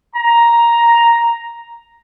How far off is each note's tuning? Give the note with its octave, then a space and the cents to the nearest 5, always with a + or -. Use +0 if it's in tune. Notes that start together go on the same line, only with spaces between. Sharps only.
A#5 +5